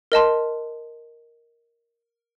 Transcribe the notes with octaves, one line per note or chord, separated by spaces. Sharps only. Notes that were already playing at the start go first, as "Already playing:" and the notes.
A#4 D#5 A5 C6